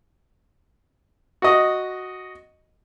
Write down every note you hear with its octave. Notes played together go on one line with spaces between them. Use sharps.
F#4 D#5